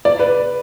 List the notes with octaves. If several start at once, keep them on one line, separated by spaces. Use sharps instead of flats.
D5
B4